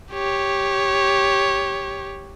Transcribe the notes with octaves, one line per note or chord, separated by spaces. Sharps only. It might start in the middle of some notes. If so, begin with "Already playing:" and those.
G4 C#5